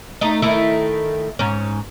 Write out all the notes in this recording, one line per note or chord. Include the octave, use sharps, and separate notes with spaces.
A3 D#4
D#3 A3 E4
G#2 C#4